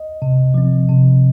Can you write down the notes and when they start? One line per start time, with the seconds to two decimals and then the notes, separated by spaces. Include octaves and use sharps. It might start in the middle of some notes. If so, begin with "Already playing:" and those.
Already playing: D#5
0.22 C3
0.54 F3 C4
0.89 C3